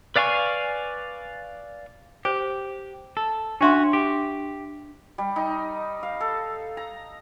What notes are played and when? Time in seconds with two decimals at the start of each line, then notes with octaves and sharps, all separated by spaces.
0.16 B4 D5 F5 G#5 C#6
2.25 G4 C5
3.17 A4
3.61 C#4 D4 F#4 E5 C6
3.93 G4
5.18 G3
5.36 D#4
6.03 F5
6.20 A4
6.77 A#5